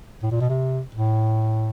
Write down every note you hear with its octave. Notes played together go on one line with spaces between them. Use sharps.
A2
A#2
B2
C3
A2